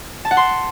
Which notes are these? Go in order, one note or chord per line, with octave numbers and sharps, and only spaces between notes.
A5
F#5
C6